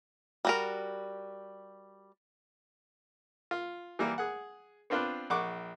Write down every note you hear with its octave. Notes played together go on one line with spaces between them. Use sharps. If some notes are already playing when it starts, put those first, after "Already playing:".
G3 F#4 A#4
F4
E3 G3 A#3
G#4 F#5
B3 C4 D4 F4 B4
A#1 F#5 C#6 D6